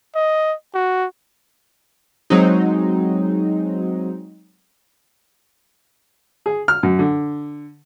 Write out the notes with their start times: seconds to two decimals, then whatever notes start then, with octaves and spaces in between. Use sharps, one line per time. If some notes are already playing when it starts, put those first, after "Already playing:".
0.15 D#5
0.75 F#4
2.30 F#3 G#3 C4 D#4
6.46 G#4
6.68 F6
6.83 F#2
6.99 D3